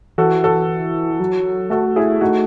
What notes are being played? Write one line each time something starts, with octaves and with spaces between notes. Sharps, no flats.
E3 F#4 A4
F#4 A4
F#3
A3 F#4 A4
E4 G#4
A3 D#4 F#4